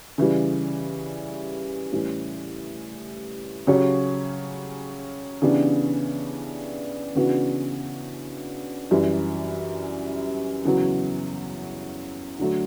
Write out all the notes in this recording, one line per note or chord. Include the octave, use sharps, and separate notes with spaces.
C#3 E3 G3
A2 E3 G3 C#4
C#3 F#3 C#4 G4 C#5
C#3 E3 B3 D4 G4
C#3 E3 B3 D4 F#4
F#2 E3 G3
E2 C#3 F#3 B3
D3 F#3 A3